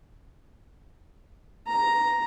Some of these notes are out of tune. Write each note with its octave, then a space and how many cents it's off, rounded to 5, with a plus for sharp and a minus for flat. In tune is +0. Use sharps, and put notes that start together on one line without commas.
A#5 +5